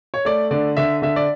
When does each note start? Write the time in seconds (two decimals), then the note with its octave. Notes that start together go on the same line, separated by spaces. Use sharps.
0.14 C#5
0.25 A3 D5
0.51 D3 D5
0.77 D3 E5
1.02 D3 E5
1.16 D5